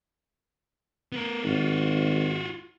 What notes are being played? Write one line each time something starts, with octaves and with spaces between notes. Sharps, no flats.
B3 A#4
G#1 F4 F#4